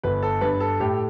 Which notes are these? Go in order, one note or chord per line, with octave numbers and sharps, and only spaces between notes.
G1 B4
A4
G2 B4
A4
A2 G4